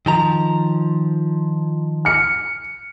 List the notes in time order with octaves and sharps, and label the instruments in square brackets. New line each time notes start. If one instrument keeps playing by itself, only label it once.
[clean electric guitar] D#3 F3 A#5
[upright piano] F6 C#7